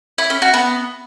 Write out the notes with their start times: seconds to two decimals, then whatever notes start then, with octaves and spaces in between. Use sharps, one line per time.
0.18 E4
0.30 C#4
0.42 F#4
0.54 B3